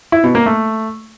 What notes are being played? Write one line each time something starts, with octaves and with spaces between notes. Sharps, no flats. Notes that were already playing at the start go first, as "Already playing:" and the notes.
E4
B2
A#3
A3